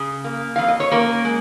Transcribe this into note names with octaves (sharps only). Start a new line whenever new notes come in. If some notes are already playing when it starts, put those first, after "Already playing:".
Already playing: C#3 G#4
A#3
F2 F5
D#5
C#5
A#3 C#4 A#4
G#3